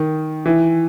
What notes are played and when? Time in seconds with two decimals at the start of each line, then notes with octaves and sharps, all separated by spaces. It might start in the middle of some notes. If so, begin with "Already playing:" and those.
Already playing: D#3
0.46 E3